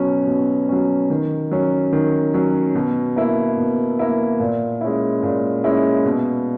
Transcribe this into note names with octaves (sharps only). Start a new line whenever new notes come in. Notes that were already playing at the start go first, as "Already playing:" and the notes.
Already playing: B2 F#3 C#4
B2
F#3 C#4
D#3
F#3 C#4
D#3
F#3 C#4
B2
A#3 E4
B2
A#3 E4
A#2
G#3 C#4 E4
A#2
G#3 C#4 E4
B2